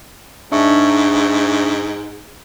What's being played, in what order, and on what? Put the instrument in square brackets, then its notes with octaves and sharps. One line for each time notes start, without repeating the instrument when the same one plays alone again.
[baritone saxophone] G#2 [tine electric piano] D4 E5 C#6